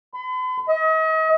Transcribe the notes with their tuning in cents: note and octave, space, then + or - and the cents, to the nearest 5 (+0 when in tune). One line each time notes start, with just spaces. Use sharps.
B5 +45
D#5 +40